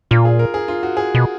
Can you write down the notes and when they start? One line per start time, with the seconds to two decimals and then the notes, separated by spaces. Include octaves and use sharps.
0.11 A#2 F4
0.25 G#4
0.39 A#4
0.54 G#4
0.68 F4
0.83 F#4
0.97 G#4
1.15 B2